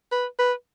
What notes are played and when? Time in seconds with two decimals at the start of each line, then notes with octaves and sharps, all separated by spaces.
0.12 B4
0.39 B4